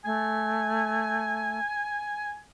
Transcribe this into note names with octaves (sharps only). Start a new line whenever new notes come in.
A3 G#5